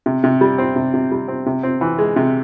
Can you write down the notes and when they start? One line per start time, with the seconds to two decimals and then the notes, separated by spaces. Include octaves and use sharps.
0.06 C3
0.24 C3
0.41 G3
0.58 C4
0.76 C3
0.94 C3
1.11 G3
1.28 C4
1.46 C3
1.63 C4
1.81 E3
1.98 G#3
2.16 C3